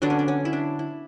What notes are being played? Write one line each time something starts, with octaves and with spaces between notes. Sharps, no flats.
D3 F#3 B3 D4
C#4
D4
C#4
E4
D4
E4